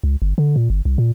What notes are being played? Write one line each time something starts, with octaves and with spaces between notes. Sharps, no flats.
C#2
G1
D3
A#2
G1
C2
A#2